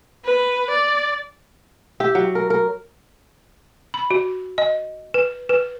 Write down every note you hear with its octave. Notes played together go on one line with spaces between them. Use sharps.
B4
D5
G4 E5
F#3
A#4
A#4
B5
F#4
D#5
B4
B4